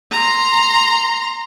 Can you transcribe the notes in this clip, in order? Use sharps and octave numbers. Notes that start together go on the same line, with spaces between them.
A#5 C6